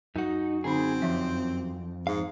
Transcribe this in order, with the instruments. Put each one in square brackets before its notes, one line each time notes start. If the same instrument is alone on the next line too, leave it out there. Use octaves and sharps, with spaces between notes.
[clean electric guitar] F#2 F#4 [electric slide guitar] D#4
[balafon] D3 D#4 B5 [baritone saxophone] C4 [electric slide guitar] G#4
[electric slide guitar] F2 [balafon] F3 E5
[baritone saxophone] G#2 [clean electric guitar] F5